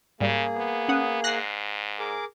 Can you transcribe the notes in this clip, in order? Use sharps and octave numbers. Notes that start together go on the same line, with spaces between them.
G#2 C#3 G3 A#3 G#4
B3
C#4 F#5 D#6
G#2 F#6 A#6 C7
G#4 A#4 D6